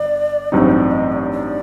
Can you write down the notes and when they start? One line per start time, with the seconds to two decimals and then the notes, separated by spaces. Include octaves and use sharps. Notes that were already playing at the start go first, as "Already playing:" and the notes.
Already playing: G1 D5
0.52 A1 G2 F#3 C4 D#4 C5 D5
0.71 D5
0.91 D#5
1.12 D5
1.31 D5